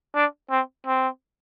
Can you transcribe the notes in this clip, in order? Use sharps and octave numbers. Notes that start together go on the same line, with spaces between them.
D4
C4
C4